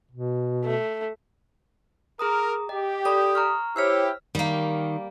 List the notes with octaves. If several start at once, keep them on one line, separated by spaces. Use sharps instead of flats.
B2
A3
G#4 A#4 A#5 D#6
G4 D#5
A4 D5 B5 D#6
A#5 C#6 F6
E4 G4 C5 C#5 E6 F6 B6
D#3 G3 A#3